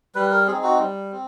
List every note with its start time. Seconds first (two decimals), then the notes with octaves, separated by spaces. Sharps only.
0.15 G3 B4
0.31 A#4
0.47 C4 D#4 G#4
0.63 F#4
0.79 G3
1.12 C4